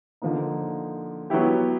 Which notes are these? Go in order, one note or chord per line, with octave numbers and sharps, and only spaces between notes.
D3 F3 A#3 D#4
F#3 B3 E4 G4